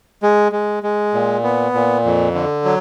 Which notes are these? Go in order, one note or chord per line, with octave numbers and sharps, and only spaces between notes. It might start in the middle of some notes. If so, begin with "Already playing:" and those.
G#3
G#3
G#3
A#2
B3
A#2
F2
D3
F#3